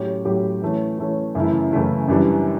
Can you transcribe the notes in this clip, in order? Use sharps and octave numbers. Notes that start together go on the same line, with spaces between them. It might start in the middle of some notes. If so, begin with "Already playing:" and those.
Already playing: A2 F#3 C#4 G4
A2 F#3 C#4 G4
E3 A3 C#4
E3 A3 C#4
F#2 C#3 E3 A3 E4
F#2 C#3 E3 A3 E4
F#2 E3 G3 D4